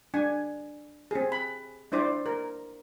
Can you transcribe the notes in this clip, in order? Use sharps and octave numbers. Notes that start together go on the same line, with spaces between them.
D4 G#5
C4 G#4
B5
D4 E4 C5 D5
A#4